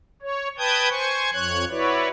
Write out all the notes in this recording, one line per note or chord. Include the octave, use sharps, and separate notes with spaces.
C#5
B4 G5 A5 D#6 G6 G#6
C5 G#5 C#6
F2 C#5 F#6 G#6
E4 F#4 B4 C#5 D5